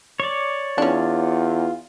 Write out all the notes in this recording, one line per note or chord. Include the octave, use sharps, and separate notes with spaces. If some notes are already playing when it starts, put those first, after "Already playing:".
C#5 D5
E2 C#4 D4 F4